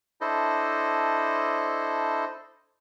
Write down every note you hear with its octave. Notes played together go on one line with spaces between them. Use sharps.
D4 E4 A4 C5 D#5